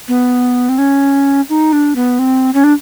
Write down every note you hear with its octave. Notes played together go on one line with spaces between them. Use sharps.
B3
C4
C#4
D#4
D4
B3
C4
C#4
D4